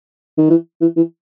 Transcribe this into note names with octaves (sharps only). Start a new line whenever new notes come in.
D#3
E3
E3
E3